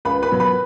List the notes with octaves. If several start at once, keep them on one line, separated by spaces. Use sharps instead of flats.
C#2 B4 B5
B4 B5
B2 F#3
B4 B5